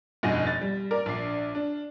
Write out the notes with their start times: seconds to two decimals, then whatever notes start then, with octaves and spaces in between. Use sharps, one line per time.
0.23 F1 G2 B2 D#5 G#5 A#6
0.47 A6
0.61 G3
0.91 A#4 D5
1.06 A#1 D4 D5 C7
1.55 D4